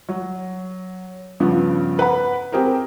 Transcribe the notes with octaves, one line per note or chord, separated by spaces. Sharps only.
F#3
G2 C#3 F3 B3
B4 F#5 B5
C4 G4 G#4 A#4 C5